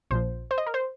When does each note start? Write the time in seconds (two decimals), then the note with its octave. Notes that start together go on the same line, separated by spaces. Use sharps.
0.11 A#1 A#2 F3 C5
0.51 C5
0.58 D#5
0.66 A#4
0.74 C5